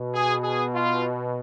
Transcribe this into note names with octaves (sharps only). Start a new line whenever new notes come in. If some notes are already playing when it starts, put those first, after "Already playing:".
Already playing: B2
G#4
G#4
F4